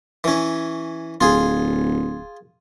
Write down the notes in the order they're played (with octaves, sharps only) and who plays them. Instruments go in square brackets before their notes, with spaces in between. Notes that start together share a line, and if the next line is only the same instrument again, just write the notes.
[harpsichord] E3 C#4
[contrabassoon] D1 [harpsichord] F4 G#4